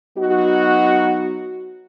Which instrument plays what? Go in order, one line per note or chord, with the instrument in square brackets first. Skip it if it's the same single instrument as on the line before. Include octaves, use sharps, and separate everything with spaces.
[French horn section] F#3 B3 D#4 F#4